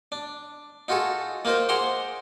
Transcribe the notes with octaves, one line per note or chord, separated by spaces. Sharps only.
D4
D#4 F4 F#4 G#4 A4
A#3 D#4 F4 A#4 C5
G#4 C5 F#5 A#5 C6 D6